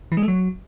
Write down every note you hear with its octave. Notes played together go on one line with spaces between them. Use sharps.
E3
G#3
A3
F#3